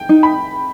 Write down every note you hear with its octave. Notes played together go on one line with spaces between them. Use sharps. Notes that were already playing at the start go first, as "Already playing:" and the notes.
Already playing: G5
D#4
B5